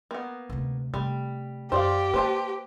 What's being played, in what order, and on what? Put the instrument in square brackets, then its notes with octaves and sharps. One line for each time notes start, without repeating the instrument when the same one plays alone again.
[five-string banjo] A#3 B3
[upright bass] D2 C3
[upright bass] C3 A3 [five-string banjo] G3
[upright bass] F#2 [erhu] G4 [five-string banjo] C5 D5 F5
[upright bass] A#3 [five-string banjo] B4 C5 A5